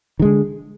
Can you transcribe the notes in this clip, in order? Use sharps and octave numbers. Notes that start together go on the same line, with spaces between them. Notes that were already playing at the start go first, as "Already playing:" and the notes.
D3 D#3 G#3